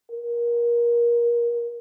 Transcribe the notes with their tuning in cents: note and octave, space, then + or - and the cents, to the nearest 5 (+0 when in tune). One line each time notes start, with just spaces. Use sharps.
A#4 +25